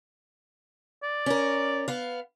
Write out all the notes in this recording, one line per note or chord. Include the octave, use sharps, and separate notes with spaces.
D5
C#4 A#4
B3 F5